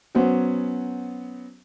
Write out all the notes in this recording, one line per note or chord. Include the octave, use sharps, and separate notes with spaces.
F#3 B3 C#4 C5